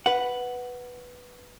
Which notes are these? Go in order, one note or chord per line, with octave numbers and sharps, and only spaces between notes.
B4 F#5